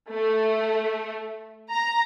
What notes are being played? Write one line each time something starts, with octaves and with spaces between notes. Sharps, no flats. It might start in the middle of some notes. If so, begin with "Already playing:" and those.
A3
A#5